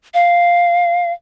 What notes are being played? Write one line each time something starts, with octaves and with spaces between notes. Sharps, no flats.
F5